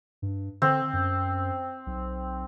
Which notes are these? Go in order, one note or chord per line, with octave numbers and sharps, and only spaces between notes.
G2
D3 C4
F#2
B1